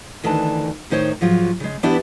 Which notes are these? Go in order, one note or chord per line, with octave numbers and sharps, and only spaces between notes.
D2 D#3 E3 D4 A5
A2 D#3 D#4 C5 C#5 G5
G#2 F3 F#3 F4
C#3 G#3
E3 B3 D4 E4 G4 E5